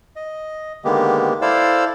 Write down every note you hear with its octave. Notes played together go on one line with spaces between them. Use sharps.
D#5
D3 D#3 G#3 A#3 B3 G4
E4 A4 C5 D5 F5 E6